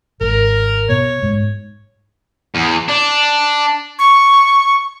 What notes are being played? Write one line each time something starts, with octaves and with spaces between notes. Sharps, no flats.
G#1 A#4
B2 C#5
G#2
E2
D4
C#6